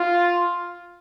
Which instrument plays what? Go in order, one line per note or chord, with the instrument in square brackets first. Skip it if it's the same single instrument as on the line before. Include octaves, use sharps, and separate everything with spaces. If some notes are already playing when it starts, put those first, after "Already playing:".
Already playing: [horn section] F4